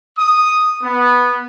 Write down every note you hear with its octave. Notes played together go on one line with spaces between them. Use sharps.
D#6
B3